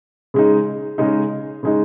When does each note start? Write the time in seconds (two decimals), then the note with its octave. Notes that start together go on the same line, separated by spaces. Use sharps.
0.34 C#3 G#3 D#4
0.98 C#3 G#3 D#4
1.63 C#3 G#3 D#4